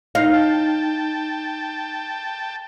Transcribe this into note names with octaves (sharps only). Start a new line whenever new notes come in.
D#4 F5
G5 A5